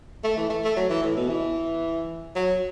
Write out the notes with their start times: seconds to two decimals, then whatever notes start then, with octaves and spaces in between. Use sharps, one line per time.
0.24 A3
0.37 E3
0.50 A3
0.64 A3
0.77 F#3
0.90 E3
1.03 A2
1.17 B2
1.29 E3
2.36 F#3